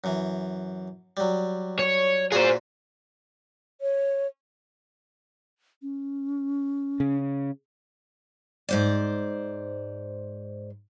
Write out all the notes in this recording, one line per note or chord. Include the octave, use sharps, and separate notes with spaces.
F#2 E3
F#3 G3
C#5
A#2 F4 F#4 G#4 C5
C#5
C#4
C#3
G#2 C5 D5